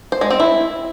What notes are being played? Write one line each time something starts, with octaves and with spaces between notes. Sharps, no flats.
C5
G#3
C4
E4